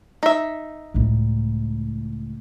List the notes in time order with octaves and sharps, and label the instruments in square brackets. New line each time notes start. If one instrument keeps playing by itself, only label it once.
[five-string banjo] D#4 E5
[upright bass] C#2 A2